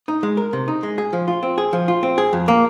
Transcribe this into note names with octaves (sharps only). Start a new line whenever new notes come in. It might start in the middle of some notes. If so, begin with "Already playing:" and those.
D#4
G#3
A#4
C3
D#4
G#3
G#4
F3
F4
C4
G#4
F3
F4
C4
G#4
F2
A#3